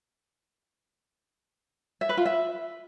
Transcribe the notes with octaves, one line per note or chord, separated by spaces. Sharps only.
E5
B4
F4
E5